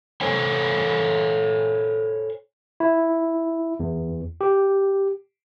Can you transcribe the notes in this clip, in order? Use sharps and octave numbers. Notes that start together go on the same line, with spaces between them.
A4 C5 C#5 G#5
E4
E2
G4